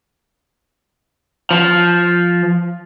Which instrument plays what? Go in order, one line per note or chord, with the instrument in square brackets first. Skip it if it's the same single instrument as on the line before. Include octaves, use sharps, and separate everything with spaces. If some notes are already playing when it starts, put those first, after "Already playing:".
[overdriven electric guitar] F3